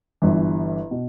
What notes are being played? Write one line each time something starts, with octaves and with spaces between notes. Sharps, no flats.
G1 G2 E3
B2